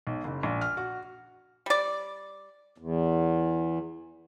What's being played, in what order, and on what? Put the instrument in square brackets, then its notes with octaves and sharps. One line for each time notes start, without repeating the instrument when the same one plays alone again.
[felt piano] B1
F#1
A#1
F6
F#4
[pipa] G3 D5
[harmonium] E2